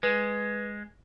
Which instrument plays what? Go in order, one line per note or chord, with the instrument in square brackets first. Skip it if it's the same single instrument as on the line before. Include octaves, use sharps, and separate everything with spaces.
[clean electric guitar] G#3 [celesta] B4